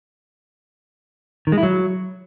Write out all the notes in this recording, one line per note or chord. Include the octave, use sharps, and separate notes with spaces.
D#3
G#3
E4
F#3